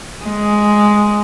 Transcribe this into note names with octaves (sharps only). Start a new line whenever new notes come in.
G#3